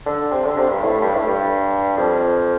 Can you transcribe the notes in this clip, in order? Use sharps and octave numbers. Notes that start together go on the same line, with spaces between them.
D3
C3
D3
C3
G2
A2
G2
A2
G2
F2